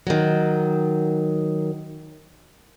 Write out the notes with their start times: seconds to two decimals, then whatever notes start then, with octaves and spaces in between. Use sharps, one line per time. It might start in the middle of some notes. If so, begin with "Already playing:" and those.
0.07 D#3 F#3